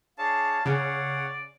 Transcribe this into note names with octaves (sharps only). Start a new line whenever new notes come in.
D4 G#4 C#5 F5 A5
C#3 C#5 D5 F#5